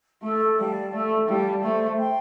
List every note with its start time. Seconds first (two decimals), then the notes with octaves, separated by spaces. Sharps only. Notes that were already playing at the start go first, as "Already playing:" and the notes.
0.22 A3 A4
0.57 G3 D5 F5 A5
0.93 A3 A4
1.28 G3 D5 F5 A5
1.63 A3 C5
1.98 G5 C6